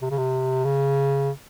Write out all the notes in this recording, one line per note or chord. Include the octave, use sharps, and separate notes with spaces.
C3
C#3
C3
C#3